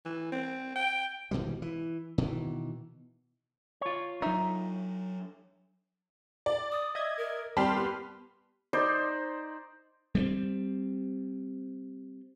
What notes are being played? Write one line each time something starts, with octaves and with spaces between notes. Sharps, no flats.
E3
C4
G5
G#1 B2 E3 G3
E3
B2 D#3 E3
F4 C#5
F#3 D4 D#4 E5
D5
D#6
D#5 E5 G#6
A#4
G3 C4 A#4 A5 B5 C6 F6
B3 G4
D#4 C5 D5 C6
G3 A3 C4